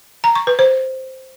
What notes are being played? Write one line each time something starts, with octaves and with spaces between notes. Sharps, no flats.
A#5
C#6
B4
C5